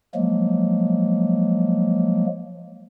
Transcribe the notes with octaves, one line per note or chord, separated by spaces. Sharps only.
F3 F#3 G#3 A#3